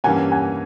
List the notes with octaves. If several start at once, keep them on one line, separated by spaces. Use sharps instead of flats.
G2 E3 G3 A#3 C#4 F#5 G#5
F#5 G#5